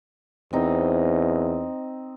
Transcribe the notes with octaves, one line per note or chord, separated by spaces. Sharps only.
E2 C4 D#4